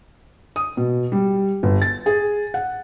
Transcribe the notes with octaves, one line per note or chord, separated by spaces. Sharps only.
D#6
B2
G3
G1
A6
G#4
F#5